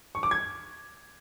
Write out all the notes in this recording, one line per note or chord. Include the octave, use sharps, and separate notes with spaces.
C#6
D6
G#6